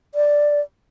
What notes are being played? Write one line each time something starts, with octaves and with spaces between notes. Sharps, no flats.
D5